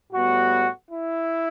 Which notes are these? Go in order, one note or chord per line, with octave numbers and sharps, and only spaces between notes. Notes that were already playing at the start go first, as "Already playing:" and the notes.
A2 G3 B3 F#4
E4